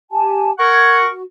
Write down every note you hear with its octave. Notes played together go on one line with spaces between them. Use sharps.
G4 G#5 A5
A#4 F#5 C#6 G#6
F#4